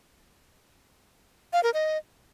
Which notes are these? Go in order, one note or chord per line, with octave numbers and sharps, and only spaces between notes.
F5
A#4
D#5